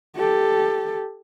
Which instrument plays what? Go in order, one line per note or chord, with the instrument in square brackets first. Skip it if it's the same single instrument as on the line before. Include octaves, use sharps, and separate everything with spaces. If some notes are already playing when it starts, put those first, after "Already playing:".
[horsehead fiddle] G4 A4